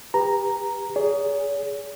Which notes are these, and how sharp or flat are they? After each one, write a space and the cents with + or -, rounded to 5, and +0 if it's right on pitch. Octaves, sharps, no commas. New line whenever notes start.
G4 +30 B4 +0 A#5 +0
G#4 +0 C#5 +45